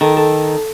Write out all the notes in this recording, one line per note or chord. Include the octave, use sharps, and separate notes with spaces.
D#3 A4
A4